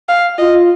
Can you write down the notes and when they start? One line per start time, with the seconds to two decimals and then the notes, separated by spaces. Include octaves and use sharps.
0.09 F5
0.38 F4 D#5